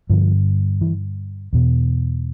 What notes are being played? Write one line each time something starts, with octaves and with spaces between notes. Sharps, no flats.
G2 D3 F3
E3
E2 B2